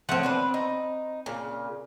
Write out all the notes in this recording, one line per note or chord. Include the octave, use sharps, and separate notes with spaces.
F3 A3 C4 C#5 F#5
B3 D4 B4
D#4
A#2 C#3